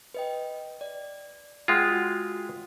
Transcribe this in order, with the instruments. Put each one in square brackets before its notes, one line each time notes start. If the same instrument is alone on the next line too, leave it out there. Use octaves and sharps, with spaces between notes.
[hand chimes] B4 D#5 G5
D5
[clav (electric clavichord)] G#3 F4 [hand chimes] F#5 G5
[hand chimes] F#4